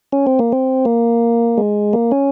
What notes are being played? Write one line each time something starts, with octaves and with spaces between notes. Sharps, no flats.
C#4
C4
A#3
C4
A#3
G#3
A#3
C#4